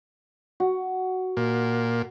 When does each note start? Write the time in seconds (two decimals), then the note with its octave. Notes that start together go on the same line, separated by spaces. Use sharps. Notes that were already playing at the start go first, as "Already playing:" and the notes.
0.60 F#4
1.37 A#2